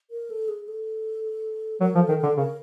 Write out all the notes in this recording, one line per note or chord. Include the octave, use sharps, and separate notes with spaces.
A#4
A4
G#4
A4
F#3 A#4
F3
A4
D#3
A4
D3
C#3 A#4